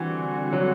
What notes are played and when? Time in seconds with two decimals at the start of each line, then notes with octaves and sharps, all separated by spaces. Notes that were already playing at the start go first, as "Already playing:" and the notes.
Already playing: D3 E3 G3 C4 F#4
0.53 F#3